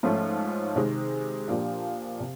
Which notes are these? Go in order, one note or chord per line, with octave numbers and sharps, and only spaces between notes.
G#2 F3 A3 C#4 F4
C3 D#3 G#3 C4
A#2 F3 A#3 D4 G4
C3